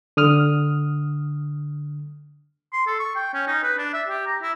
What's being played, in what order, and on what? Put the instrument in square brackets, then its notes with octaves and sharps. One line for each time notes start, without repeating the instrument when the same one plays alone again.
[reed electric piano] D3 D#6 F6
[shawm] C6
A4
C#6
G5
C#4
D#4
B4
D4
E5
G4
A#5
E4